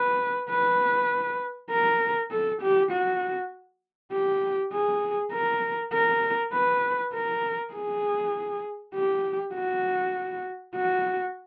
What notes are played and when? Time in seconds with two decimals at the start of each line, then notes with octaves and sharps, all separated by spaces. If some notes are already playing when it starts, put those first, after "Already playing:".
Already playing: B4
0.50 B4
1.71 A#4
2.31 A4
2.61 G4
2.91 F#4
4.12 G4
4.73 G#4
5.32 A#4
5.93 A#4
6.53 B4
7.14 A#4
7.74 G#4
8.94 G4
9.54 F#4
10.76 F#4